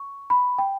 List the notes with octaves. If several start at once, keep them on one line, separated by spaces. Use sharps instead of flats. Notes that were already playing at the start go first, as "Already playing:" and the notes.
Already playing: C#6
B5
G5